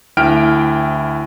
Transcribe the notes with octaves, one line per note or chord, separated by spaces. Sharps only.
D2 E4 G5 F6 D7